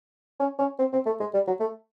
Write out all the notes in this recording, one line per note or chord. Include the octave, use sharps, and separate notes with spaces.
C#4
C#4
C4
C4
A3
G#3
G3
F#3
A3